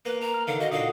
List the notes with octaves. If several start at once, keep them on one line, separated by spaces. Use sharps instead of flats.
A#3 B4
A#4 A#5
F6
D3 D#3 F5
F#4 D#5 F5
A#2 D3 F#4 F5 D#6